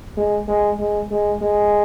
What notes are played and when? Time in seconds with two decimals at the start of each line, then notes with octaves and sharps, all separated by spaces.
0.17 G#3
0.48 G#3
0.80 G#3
1.11 G#3
1.42 G#3